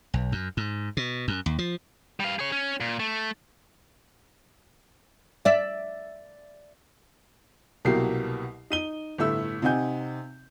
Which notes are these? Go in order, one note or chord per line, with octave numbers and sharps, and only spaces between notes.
B1
F#2
G#2
B2
F#2
D#2
F3
G3 F5
G#4 C#5
C#4
A#2
A3
D5 E5
C2 B2 F#3 A#3 G4 C7
D#4 D#7 G7
G1 A2 A3 E5 E6
C3 C4 D#4 F#5 G#5 G6